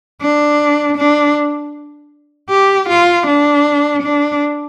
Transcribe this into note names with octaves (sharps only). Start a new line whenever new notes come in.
D4
D4
G4
F4
D4
D4